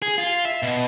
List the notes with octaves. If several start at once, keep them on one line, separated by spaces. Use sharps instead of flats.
G#4
F4
E5
B2